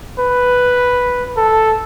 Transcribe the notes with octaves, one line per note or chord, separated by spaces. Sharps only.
B4
A4